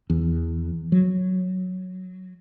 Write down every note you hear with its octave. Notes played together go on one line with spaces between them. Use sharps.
E2
F#3